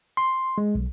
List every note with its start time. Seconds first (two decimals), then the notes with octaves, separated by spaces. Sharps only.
0.17 C6
0.58 G#3
0.75 B1